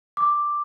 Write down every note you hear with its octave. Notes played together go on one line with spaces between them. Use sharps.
D6